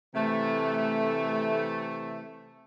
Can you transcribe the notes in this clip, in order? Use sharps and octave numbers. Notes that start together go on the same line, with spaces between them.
C3 E3 A3